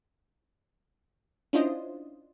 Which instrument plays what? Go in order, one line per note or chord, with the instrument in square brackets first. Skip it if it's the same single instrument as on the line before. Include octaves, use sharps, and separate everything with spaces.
[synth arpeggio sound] C#4 D4 E4 F4 C5 D#5